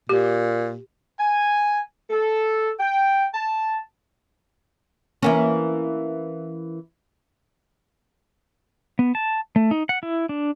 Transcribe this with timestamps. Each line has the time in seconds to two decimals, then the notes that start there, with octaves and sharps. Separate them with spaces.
0.09 A#2 G4
1.19 G#5
2.10 A4
2.79 G5
3.33 A5
5.22 E3 A#3 C#4
8.99 B3
9.15 A5
9.56 A3
9.71 D#4
9.89 F#5
10.03 E4
10.29 D4